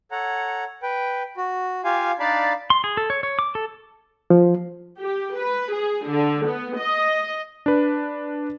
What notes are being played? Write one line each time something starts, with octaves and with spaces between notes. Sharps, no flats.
A4 C#5 F#5 A#5
B4 G5
F#4
F4 G4 F5 G#5
D4 D#4 D5 F5 A5 B5
C6
G#4
A4
C#5
C#5
D6
A4
F3
G4
B4
G#4
D3
B3
D#5
D4 B4